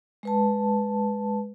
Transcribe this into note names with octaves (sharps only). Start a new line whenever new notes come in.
G#3 B4 A5